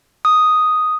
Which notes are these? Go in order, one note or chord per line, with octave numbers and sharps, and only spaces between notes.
D#6